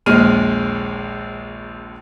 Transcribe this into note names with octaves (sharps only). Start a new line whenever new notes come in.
A#1 D#2 G#3 F6 D#7